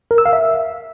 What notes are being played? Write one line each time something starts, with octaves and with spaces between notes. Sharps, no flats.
A#4
E6
F5
E5